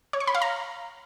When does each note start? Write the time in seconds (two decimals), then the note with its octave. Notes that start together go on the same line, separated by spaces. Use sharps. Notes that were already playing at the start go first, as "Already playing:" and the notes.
0.13 C#5
0.20 C#6
0.27 B5
0.35 F5
0.42 A#5